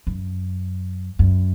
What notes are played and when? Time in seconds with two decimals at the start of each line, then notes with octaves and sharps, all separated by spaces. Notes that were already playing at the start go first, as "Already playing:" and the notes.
0.07 F#2
1.19 F#2